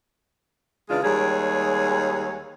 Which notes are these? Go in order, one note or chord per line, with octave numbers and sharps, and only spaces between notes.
C#3 E3 G#3 D4 F4
D#2 G3 G#3 G#4 C#5